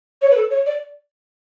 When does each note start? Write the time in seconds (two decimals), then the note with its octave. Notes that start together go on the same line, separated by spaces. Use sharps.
0.21 C#5
0.31 B4
0.36 A4
0.50 C#5
0.66 D5